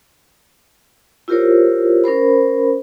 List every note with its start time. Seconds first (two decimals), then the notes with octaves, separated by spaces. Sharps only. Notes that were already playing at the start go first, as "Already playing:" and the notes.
1.28 E4 F4 G4 A#4 C5 C#5
2.04 C#4 A#4 C5 B5